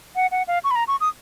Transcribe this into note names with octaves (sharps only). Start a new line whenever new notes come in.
F#5
F#5
F5
C#6
B5
A#5
C#6
D#6